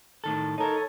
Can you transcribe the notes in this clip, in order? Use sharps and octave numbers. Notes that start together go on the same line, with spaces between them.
A2 D#3 A4
D#4 A4 A#4 C#5 A5